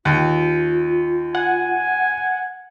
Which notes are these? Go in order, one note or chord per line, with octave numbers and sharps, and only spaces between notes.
D#2 F4
F#5 G#5